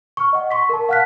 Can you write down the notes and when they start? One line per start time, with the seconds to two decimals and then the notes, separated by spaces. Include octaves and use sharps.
0.17 C#6 F6
0.33 D#5 F#5
0.51 C6 C#6 B6
0.69 A#4 A5
0.89 F5 F#5 A5 F6 F#6 B6